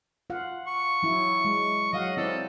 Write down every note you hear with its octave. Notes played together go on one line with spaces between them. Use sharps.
F4 F5 F#5
C#6
F#3 E4
G#3
F#3 D#5 F5 F#5
C4 E4 A4 D5